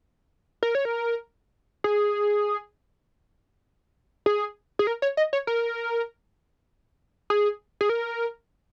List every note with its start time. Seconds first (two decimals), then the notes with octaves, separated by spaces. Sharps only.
0.63 A#4
0.75 C#5
0.85 A#4
1.84 G#4
4.26 G#4
4.79 G#4
4.87 A#4
5.02 C#5
5.17 D#5
5.33 C#5
5.47 A#4
7.30 G#4
7.81 G#4
7.89 A#4